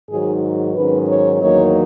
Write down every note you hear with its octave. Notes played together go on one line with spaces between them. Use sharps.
G#2 D#3 F#3 G#4
G#2 D#3 F#3 C#4 B4
C#5
E2 D#3 F#3 A#3 D#4 C#5